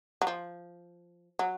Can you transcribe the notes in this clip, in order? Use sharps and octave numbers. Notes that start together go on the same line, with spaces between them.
F#3
F3
F#3